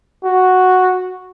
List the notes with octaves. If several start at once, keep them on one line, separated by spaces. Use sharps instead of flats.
F#4